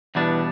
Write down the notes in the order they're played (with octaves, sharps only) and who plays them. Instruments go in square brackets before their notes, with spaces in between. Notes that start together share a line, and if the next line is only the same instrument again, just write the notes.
[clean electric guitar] E2 B2 G3 B3 D4 [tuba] E3